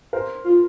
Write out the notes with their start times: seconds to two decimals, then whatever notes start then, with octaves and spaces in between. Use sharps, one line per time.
0.13 A#4 C5
0.45 F4